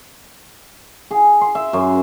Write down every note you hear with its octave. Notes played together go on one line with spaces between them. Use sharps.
G#4
C6
E5
F#2